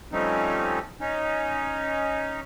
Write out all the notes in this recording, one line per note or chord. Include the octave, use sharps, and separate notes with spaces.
F3 G3 A3 C4 C#4 D#4
C#4 D#4